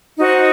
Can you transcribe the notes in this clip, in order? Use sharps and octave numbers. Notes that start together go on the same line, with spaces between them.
D#4 F#4 C5